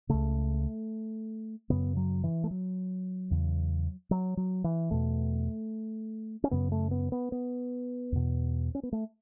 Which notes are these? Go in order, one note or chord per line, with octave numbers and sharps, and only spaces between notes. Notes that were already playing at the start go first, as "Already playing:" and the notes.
C#2 C#3 A3
F#2 C#3 B3
F#3
E3
A3
F#3
E2 C#3
F#3
F#3
E3
E2 B2 A3
C#4
F#2 C#3 B3
A3
B3
B3
B3
E2 B2
C#4
B3
A3